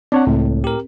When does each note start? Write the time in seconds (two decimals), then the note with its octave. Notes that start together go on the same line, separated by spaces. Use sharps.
0.12 C4 D4 C#5 F#5
0.27 C#2 A2
0.64 G4 A#4